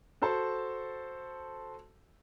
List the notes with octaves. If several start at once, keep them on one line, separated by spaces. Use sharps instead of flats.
F#4 A4 C5 A5